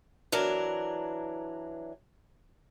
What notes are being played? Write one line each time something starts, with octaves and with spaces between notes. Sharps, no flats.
E3 F#3 D4 A#4